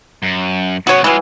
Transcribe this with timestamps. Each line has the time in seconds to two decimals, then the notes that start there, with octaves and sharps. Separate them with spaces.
0.23 F#2
0.87 C#3 B3 F#4 C#5
1.04 E3 F#3 G#3 F4